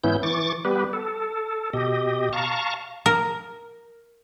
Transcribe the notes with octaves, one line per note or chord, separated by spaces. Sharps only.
G#2 E3 B3 C#4 E4 G6
E3 C#6 D6 A6
G3 B3 G4 B4
A4
B2 G4 D#5
F5 A5 A#5 C#6
A#4